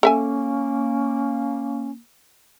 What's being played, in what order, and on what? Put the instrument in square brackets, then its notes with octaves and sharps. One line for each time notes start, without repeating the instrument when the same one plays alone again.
[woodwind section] A#3 [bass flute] C#4 [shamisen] A4 E5 G#5